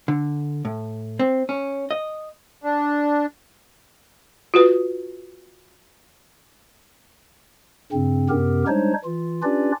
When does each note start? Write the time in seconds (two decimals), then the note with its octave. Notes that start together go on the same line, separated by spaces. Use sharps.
0.08 D3
0.65 A2
1.19 C4
1.49 C#4
1.91 D#5
2.63 D4
4.54 F4 F#4 B4
7.93 G2 C#3 C4
8.29 F#2 C3 B3 G4 A#4
8.67 G3 G#3 D4 D#4 C5 C#5
9.05 E3 F4
9.43 C#4 D4 F4 G4 B4 D5